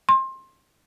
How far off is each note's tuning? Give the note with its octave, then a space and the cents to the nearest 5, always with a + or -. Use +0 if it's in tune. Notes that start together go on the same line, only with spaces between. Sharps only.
C6 +25